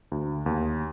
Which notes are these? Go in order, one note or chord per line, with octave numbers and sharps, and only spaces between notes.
D2
D#2